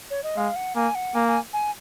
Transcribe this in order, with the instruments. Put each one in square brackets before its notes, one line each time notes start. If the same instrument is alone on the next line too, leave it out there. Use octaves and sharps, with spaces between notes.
[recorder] C#5
D#5
[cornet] G#3 [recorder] F5
[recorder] F#5
[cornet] A#3 [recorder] G#5
[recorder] F#5
[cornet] A#3 [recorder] G#5
[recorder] G#5
G#5